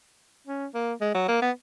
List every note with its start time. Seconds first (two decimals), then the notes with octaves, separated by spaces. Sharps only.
0.47 C#4
0.74 A#3
1.01 G#3
1.14 F#3
1.28 A#3
1.42 B3